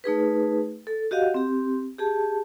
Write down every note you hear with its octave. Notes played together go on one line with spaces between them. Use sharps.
A3 D#4 G#4 B4
A4
F#4 G4 D#5 F5 F#5
C4 G4
G4 G#4 A5